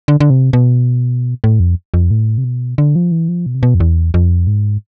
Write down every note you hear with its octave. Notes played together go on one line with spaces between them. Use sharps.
D3
D3
C3
B2
A2
F2
F2
A2
C3
B2
D3
F3
E3
F3
B2
C3
B2
F2
E2
F2
G#2